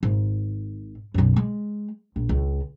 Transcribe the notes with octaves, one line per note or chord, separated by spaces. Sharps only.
G#1
B1 F#2
G#3
A#1
C#2